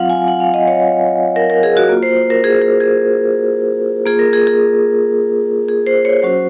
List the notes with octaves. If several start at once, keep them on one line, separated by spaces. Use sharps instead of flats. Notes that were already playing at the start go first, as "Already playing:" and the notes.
Already playing: F#3 C4 F4 F5 F#5
G#5
F#5
F5
D#5
C#5
A#4
A#4
G#4
F#4
A#3 F4
C5
A#4
G#4
G#4
G#4
A#3 F4 G#4
A#4
G#4
G#4
G#4
C5
C#5
F#3 C#4 F#4 C5